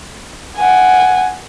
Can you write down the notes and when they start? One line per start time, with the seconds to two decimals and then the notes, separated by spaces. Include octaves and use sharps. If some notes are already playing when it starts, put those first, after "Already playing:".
0.57 F#5 G#5